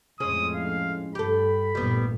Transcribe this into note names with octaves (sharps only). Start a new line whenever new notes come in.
F2 A2 G#3 C#4 G#4 D#6
F5
G2 G4 A4 B5
A1 G2 A#2 G3 B3